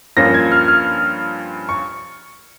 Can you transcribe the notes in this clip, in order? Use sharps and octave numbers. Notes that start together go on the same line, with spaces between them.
G2 F3 A#3 C#4 F4 A#6
G#6
F6
F6
C#6